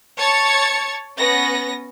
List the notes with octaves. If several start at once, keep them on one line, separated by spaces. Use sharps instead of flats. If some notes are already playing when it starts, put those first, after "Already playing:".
C#5 A5 G#6 A6 C#7
B3 C#4 A#6